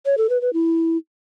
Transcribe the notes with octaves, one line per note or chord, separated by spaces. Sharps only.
C#5
A4
B4
B4
E4